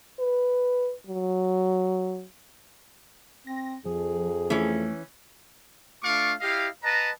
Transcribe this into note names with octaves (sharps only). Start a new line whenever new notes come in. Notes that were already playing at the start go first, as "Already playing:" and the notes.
B4
F#3
C4 A#6
F2 F3 G#4
E3 A3 C#4
A3 D4 F4 F5 C#6 D6
E4 G4 D#5 F5
B4 D#5 F#5 A5 A#5